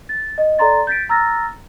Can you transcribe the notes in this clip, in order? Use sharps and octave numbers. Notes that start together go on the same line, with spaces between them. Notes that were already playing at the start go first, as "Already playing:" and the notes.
A6
D#5
A4 D5 A#5 C6 A6
G6 A6 B6 D7
A#5 E6 F6 A6 A#6